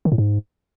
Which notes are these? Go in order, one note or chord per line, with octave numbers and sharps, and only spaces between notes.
D#3
A2
G#2